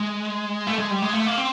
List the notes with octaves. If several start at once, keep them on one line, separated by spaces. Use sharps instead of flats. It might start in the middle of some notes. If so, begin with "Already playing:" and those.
Already playing: G#3
A3
G#3
G3
G#3
A3
A#3
C4